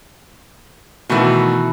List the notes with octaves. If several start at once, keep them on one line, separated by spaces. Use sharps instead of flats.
B2 D#3 E3 A3 F#4